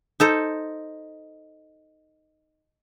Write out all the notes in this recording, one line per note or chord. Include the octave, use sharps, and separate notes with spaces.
D#4 A4 C5